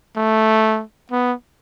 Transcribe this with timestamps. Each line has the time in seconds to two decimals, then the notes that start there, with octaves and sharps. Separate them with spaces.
0.17 A3
1.12 B3